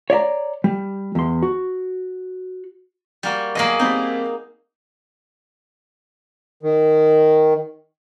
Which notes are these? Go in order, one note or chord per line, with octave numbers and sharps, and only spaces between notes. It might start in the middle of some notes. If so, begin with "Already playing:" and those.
C#5 D5 E5 A#5
G3
E2 C6
F#4
G3 A#3 F#4
B1 A#3 G#4 D#5 F#7
G3 A#3 C4 D#4
D#3